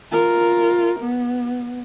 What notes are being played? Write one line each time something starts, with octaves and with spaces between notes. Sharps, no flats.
F4 A#4
B3